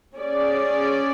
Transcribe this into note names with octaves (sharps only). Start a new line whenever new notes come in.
C#4 G#4 D5